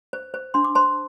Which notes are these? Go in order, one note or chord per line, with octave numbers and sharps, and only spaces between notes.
C5
C5
D4 C6
D6
C5 A5 C6